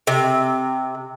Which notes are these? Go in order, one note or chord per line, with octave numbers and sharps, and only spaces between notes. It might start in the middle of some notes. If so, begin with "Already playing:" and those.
C3